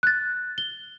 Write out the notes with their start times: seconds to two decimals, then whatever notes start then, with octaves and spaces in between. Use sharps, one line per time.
0.03 F#6 A6
0.58 G7